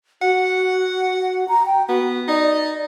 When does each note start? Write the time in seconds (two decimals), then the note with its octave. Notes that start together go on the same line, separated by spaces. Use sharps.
0.22 F#4 F#5
1.48 A#5
1.66 G5
1.88 B3 F#4
2.28 D#4 D5